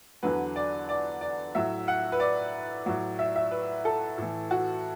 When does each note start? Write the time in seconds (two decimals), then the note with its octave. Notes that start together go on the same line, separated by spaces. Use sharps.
0.23 E2 D3 F#3 B4
0.56 D5
0.89 D5
1.21 D5
1.55 A2 F#3 E5
1.88 F#5
2.12 B4
2.20 D5
2.86 A2 F#3
3.19 E5
3.36 E5
3.51 B4
3.85 A4
4.18 A2 E3
4.51 F#4